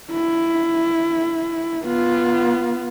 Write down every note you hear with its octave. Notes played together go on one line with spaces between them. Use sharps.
E4
B3 F4